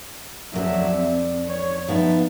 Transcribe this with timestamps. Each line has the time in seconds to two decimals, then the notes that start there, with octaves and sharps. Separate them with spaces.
0.53 F2 A#2 F#3 D5 E5
0.96 C4
1.47 C#5
1.88 F3 B3 D#4 E5